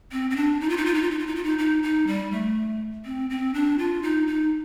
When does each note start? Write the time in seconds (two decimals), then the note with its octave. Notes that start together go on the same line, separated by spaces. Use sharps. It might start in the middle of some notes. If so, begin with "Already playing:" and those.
0.12 C4
0.30 C4
0.36 D4
0.61 D#4
0.69 F4
0.77 D#4
0.86 F4
0.94 D#4
1.02 F4
1.11 D#4
1.19 F4
1.27 D#4
1.36 F4
1.44 D#4
1.58 D#4
1.83 D#4
2.07 G3
2.32 A3
3.05 C4
3.30 C4
3.54 D4
3.79 F4
4.03 D#4
4.27 D#4